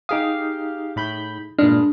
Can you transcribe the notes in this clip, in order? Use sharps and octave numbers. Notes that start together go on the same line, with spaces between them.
D#4 G4 G#4 F5 D#6
A2 B5 G6
G2 A#2 G#3 D4 F6